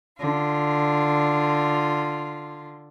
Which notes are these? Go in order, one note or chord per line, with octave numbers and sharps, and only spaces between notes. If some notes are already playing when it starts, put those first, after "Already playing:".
D3 F4